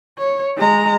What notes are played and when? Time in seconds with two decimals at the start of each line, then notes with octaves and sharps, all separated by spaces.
0.19 C#5
0.57 G#3 A#5